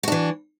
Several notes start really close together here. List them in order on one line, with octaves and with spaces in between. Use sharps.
F#4 D4 E3